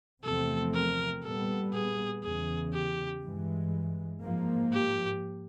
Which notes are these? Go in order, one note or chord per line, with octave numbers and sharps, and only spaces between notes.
E2 C3 F3 A3 C4 A4
A#4
A#2 G3 B3 A4
G#4
E2 C#3 E3 G#4
G4
G2 E3 G#3
G#2 F3 A#3
G4